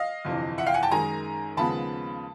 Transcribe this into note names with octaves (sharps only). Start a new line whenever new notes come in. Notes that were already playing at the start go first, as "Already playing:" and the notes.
Already playing: D#5 F5
G1 F2 C3 E3
E5 F#5
F5 G5
F#5 G#5
G5 A5
F#2 D#3 G#3 G#5 A#5
D#2 C#3 F3 G#3 B3 A5 B5